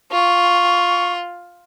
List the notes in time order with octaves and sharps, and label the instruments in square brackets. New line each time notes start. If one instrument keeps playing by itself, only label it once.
[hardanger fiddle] F4 [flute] C#6